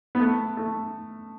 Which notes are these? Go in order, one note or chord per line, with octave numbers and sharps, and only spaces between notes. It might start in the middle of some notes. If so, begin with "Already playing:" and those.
B3
A3
A3